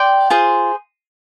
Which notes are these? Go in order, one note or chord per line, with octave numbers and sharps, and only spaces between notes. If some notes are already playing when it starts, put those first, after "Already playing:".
Already playing: D5 G5 C6
F4 G#4 C5